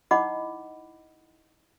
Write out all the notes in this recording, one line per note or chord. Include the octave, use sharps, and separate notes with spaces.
D#4 E4 D#5 F#5 B5 D6